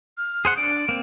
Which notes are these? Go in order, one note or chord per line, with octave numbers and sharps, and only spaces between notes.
F6
G#4 C5 F#5
D4 D7
A#3 C4